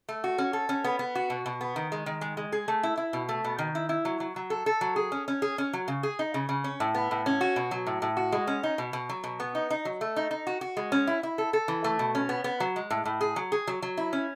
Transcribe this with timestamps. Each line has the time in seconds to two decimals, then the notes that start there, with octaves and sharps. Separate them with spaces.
0.09 A3
0.24 F#4
0.38 C#4
0.53 A4
0.69 C#4
0.84 B3
0.99 B3
1.15 F#4
1.30 B2
1.46 B2
1.61 B3
1.76 D#3
1.92 G#3
2.06 D#3
2.21 G#3
2.37 G#3
2.52 G#4
2.68 A3
2.83 E4
2.97 E4
3.13 B2
3.29 A3
3.44 B2
3.59 D#3
3.75 E4
3.89 E4
4.05 F#3
4.20 F#3
4.36 F#3
4.50 A4
4.66 A4
4.81 F#3
4.96 G#4
5.12 C#4
5.28 C#4
5.42 G#4
5.58 C#4
5.73 F#3
5.88 C#3
6.03 G#4
6.19 D#4
6.34 C#3
6.49 C#3
6.64 C#4
6.80 A2
6.95 B3
7.11 A2
7.26 C#4
7.41 F#4
7.56 B2
7.71 F#3
7.87 A2
8.02 A2
8.17 F#4
8.32 G#3
8.47 C#4
8.63 D#4
8.78 B2
8.93 B2
9.09 F#3
9.24 B2
9.40 B3
9.55 D#4
9.70 D#4
9.85 F#3
10.01 A3
10.16 D#4
10.31 D#4
10.47 F#4
10.61 F#4
10.77 G#3
10.92 C#4
11.07 E4
11.23 E4
11.38 A4
11.53 A4
11.68 E3
11.84 A3
11.99 B2
12.15 C#4
12.29 B3
12.44 B3
12.60 F#3
12.76 G#3
12.90 A2
13.05 A2
13.21 G#4
13.36 F#3
13.52 G#4
13.67 F#3
13.82 F#3
13.97 E4
14.13 C#4